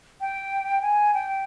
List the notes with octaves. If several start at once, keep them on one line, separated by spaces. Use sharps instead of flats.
G5
G#5
G5